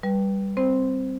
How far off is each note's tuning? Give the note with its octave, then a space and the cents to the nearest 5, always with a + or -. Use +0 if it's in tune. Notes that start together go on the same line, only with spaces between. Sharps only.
G3 +0 B4 -10
C4 +0 C5 +0